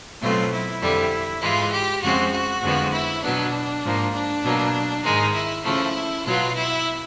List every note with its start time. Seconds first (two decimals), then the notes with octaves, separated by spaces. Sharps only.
0.21 B2 F#3 A3 C4 F4
0.51 E4
0.81 F2 D3 G3
1.41 G#2 E3 G#3 F4
1.72 G4
2.02 F2 C#3 F3 G#3 C4 F#4
2.32 F#4
2.62 F2 D3 F3 G#3 B3
2.93 E4
3.22 B2 F#3 B3 D4
3.83 G#2 F3 A#3
4.13 D4
4.44 B2 F#3 A#3
5.04 G#2 D#3 G#3 D#4
5.34 E4
5.64 C#3 F3 A3 E4
6.25 B2 F#3 B3 F4
6.55 E4